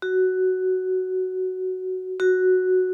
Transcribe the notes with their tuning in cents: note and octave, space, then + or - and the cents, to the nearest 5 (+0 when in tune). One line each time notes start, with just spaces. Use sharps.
F#4 +10
F#4 +0